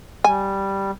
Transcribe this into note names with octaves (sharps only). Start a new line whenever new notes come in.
G3 G#5